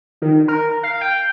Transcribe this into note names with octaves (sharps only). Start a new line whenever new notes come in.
D#3
A#4
F5
G5